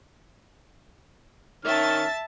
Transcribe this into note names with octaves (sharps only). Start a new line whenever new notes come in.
D#3 C#4 E5 A5 F6 A6